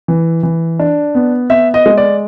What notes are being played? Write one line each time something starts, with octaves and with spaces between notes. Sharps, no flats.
E3
E3
D4
B3
B3 E5
D#5
G#3
D5